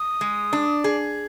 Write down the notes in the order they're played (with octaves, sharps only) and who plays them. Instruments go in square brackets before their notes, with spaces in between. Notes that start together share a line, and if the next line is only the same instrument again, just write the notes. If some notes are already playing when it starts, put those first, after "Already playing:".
Already playing: [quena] D#6
[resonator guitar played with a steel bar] G#3
D4
G#4